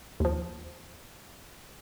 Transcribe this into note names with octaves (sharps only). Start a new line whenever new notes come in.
D#2 F3